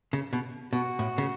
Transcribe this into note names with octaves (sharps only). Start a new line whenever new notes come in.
C#3
B2
B2 F#4
A2
C#3